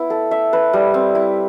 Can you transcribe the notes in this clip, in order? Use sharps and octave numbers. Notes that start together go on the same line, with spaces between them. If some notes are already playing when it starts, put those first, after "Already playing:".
Already playing: B3 E4
A4
E5
B4
G3
C4
E4